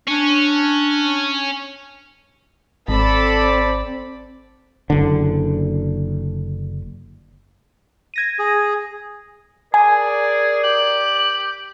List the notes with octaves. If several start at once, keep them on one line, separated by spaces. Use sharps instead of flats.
C#4 D4
G#1 C4 A4 D5 A5 B5
F#1 D3
G#6 A#6 D#7
G#4
G#4 A#4 D5 G#5
G4 F#7